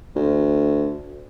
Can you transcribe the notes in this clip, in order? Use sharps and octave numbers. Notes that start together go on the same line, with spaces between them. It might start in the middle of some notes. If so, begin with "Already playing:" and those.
D2